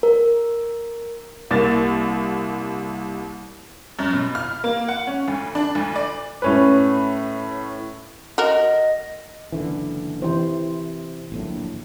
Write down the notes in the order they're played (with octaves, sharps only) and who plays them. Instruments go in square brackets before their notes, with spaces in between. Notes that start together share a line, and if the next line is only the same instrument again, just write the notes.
[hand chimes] A#4
[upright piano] C2 A#3 A6
[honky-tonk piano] F#2
B2
F6
A#3
F#5
C#4
D2
D4
D2
D5
[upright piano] A2 C#4 B4
[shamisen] F#4 A#4 [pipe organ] D#5
[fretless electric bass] F#1 D3 E3
[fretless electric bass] C3 [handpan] E3 C5
[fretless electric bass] D1 A#1 A2